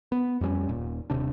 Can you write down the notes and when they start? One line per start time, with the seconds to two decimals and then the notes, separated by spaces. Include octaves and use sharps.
0.12 B3
0.41 F2 G3 A3 C#4
0.69 D#1 A#2
1.10 D#1 C3 D4